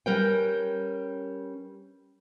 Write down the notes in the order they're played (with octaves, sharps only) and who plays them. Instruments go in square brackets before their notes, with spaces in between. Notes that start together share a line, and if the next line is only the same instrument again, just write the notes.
[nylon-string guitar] G3 C#4 A#4 B4 G5